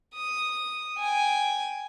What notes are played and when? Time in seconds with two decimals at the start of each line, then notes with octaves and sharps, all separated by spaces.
0.15 D#6
0.99 G5 G#5